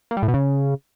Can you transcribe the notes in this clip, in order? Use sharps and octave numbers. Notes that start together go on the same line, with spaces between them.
A#3
G3
A2
B2
C#3